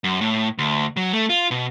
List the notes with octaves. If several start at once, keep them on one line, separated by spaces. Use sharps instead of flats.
F#2
A2
D2
F#3
A3
F4
B2